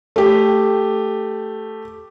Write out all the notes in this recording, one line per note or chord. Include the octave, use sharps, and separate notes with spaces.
A3 G4